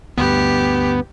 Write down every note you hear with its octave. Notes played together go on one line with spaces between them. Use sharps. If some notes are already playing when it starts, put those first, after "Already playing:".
D2 G2 B3 G4